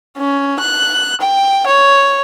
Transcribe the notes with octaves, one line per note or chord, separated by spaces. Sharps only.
C#4
F#6
G5
C#5